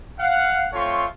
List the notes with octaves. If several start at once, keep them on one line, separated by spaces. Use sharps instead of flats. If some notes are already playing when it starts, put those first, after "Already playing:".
F5 F#5
A3 C4 F4 C#5 C6 C#6